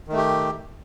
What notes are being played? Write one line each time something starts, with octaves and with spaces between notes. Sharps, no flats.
D#3 A3 G4